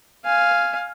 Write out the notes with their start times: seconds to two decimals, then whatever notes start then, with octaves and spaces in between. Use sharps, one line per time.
0.25 F5 G#5